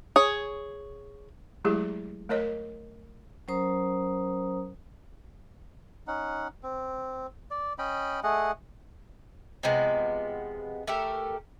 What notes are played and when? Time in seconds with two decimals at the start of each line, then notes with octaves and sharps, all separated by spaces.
0.16 G#4 C#5
1.65 F#3 G#3 A3 E4 G4 G#4
2.29 A3 A#4 C#5 D#5
3.48 F#3 C#4 A#4 C5 A#5 D#6
6.07 C#4 D#4 F#5
6.63 C4
7.51 D5
7.78 C#4 D#5 G5 B5
8.23 A3 G#4 D#5 F#5
9.63 C3 F3 G#3 B3
10.87 A3 G4 A4 A#4